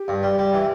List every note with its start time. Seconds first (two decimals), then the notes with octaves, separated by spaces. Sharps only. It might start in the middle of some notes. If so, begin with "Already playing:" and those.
Already playing: G4
0.08 G2
0.23 G3
0.38 G3
0.54 E3